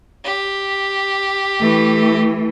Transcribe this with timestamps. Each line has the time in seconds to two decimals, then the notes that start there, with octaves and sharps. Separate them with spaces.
0.25 G4
1.60 E3 A3